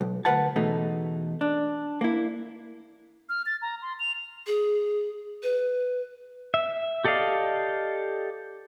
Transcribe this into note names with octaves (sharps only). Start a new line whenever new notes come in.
B1
D2 C#3 A#4 B4 F#5 A5
E2 B2 A3 D#4
D4
A#3 E4
F6
A6
A#5
C6
F7
G#4
B4
E5
G4 A4 D5 D#5 F5